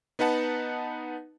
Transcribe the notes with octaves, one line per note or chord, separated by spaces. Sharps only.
B3 D#4 B4 F#5 A5